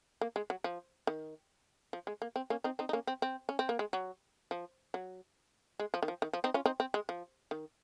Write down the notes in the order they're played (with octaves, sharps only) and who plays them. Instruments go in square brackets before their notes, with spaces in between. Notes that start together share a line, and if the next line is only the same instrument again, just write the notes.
[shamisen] A#3
G#3
F#3
F3
D#3
F3
G#3
A#3
C4
A#3 C#4
C4 D#4
C4 D#4
D#4
A#3 C#4
C4
C4
C#4
C4
A#3
G#3
F#3
F3
F#3
G#3
F3
D#3
F3
D#3
F3
C4 D#4
C#4 F4
C4 D#4
C4
G#3
F3
D#3